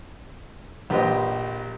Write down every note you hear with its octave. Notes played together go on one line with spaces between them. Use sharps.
A#1 G4 B4 C5 D#5